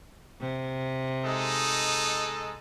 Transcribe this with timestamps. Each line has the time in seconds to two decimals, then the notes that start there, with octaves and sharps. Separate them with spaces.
0.41 C3
1.25 G#3 D#4 A4